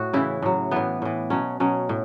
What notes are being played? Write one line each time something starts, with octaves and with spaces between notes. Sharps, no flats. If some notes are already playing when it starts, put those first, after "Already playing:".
Already playing: A2 F#4
C#3 E3 E4
A2 F#3
A2 E3 B3
A2 E3
B2 F#3 C#4
B2 F#3 C#4
A2